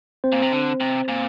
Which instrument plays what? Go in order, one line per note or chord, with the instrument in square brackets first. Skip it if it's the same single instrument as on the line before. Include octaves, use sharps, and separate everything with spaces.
[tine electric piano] C4 C5
[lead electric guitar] A#2
C3
D3
C3
A#2